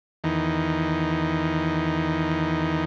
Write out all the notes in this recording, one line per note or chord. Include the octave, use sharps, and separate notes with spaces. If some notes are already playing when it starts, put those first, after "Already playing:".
E2 D#3